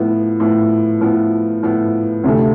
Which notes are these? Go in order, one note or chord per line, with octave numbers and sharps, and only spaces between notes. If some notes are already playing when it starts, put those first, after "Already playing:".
Already playing: A2 F3 B3
A2 F3 B3
A2 F3 B3
A2 F3 B3
D2 C3 F3 A3